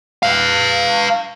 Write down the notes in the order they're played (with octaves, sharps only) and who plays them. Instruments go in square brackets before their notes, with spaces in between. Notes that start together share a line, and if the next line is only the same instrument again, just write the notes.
[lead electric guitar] B4 F5